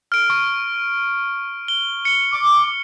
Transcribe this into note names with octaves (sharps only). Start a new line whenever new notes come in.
F6 D7
C#6
G7
C#7 G7
D6